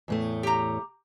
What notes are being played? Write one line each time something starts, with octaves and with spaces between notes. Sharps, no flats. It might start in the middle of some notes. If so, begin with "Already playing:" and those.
E2 A2 A3
G4 A#5